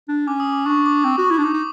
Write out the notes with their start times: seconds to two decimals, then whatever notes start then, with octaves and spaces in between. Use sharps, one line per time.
0.08 D4
0.28 C#4 D6
0.40 D#6
0.53 D6
0.66 D4 C#6
0.86 D6
1.05 C4
1.18 F#4
1.25 D6
1.31 E4
1.38 D4
1.43 D#4 D6
1.54 D#4